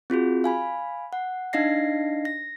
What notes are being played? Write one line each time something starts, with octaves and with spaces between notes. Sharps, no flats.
C4 F4 F#4 G#4
F5 G#5 B5
F#5
D4 D#4 D#5 F5 A#6 C7
A#6